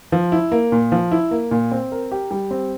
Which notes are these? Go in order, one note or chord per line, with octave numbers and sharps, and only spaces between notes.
F3
E4
A#3
A#2
F3
E4
A#3
A#2
C4
A#4
G4
G3
C4